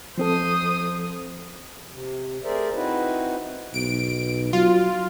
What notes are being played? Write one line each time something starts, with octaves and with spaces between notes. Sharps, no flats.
F3 C4 A4 C5 D#6
C3
A3 G#4 A#4 C5 D5 E5
C4 D#4 E4 F#4 B4
B1 D7
F#3 F4